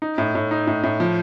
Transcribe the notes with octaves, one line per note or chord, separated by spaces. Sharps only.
D#4
A2
A2
D#4
A2
A2
F3